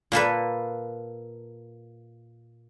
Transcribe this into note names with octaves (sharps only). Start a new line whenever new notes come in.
A#2 A#3 A4 B4